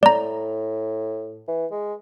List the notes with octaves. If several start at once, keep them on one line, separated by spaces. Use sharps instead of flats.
A2 D5 A#5
E3
G#3